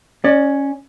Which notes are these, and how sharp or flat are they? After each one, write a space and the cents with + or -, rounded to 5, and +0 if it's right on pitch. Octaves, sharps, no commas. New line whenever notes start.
C#4 +0 D5 +30